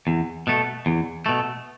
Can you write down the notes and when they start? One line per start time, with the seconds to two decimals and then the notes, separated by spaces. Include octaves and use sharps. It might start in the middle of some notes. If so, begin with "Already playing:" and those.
0.07 E2
0.47 B2 A3
0.86 E2
1.26 B2 A3